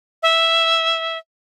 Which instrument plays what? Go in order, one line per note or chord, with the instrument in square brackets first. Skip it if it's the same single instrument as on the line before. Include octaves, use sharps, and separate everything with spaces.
[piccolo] E5